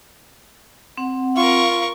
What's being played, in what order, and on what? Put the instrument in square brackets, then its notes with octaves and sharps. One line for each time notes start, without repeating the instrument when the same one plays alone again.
[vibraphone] C4 F#5
[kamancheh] F4 [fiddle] A#4 C#6